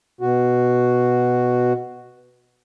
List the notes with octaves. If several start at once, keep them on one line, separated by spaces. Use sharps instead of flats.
B2 F#4